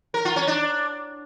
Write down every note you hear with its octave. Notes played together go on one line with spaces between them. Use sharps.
A#4
F4
C#4
D4